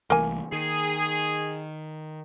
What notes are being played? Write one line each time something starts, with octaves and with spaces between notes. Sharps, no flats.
C2 E3 A3 A#3 G#5
D#3 G#4